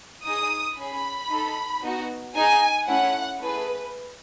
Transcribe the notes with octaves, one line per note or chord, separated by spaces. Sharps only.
D#4 G#4 D#6
C#4 G#4 B5
D#4 A4
B3 D#4 F#4
D#4 G#4 G#5
A3 C#4 E4 F#5
A3 E4 G#4 B4